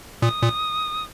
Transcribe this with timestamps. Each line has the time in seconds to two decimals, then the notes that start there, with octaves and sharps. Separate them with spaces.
0.22 A#2 D#6
0.43 A#2